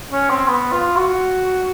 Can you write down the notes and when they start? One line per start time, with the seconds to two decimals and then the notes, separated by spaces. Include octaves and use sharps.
0.12 C#4
0.30 C4
0.48 B3
0.72 F4
0.96 F#4